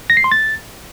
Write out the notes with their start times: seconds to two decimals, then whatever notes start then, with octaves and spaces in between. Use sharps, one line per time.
0.10 A#6
0.17 C7
0.24 C6
0.32 A6